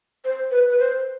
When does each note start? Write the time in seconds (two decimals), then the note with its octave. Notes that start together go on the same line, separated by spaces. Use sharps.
0.24 C5
0.51 B4
0.68 B4
0.79 C5